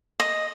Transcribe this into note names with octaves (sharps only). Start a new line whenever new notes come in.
D#5